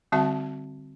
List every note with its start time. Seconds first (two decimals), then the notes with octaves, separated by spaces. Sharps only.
0.12 D3 G3 C4 F#4 E5 A5